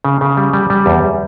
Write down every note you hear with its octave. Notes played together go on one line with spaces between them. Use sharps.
C#3
C#3
G3
G3
G3
E2